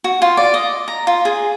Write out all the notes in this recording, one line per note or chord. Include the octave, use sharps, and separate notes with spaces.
F#4
F4
D5
D#5
A#5
F4
G#4